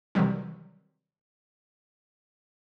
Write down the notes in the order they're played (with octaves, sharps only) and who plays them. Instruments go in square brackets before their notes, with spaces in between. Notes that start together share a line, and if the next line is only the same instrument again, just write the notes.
[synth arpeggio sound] C3 D#3 E3 F#3 G3 C4